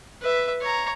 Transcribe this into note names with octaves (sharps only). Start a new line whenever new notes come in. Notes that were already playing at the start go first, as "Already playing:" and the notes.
B4 E5
C#5 A#5